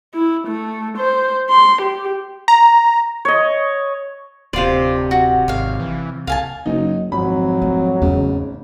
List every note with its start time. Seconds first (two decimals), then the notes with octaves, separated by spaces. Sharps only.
0.14 E4
0.48 A3
0.98 C5
1.50 C6
1.82 G4
2.48 A#5
3.25 C#5 D#5
4.53 D1 C3 F4 D5 C6
5.11 F#4
5.48 G#1 C#5 F5
5.80 E3
6.27 C2 F5 G#5 A5
6.66 F#1 F#3 D#4
7.12 G#1 F2 F#3 B5
7.62 A3
8.02 E2 C#3 A3